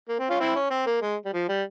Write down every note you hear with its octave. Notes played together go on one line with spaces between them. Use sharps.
A#3
C4
C#4 F4
C4 E4
C#4
C4
A#3
G#3
G3
F3
G3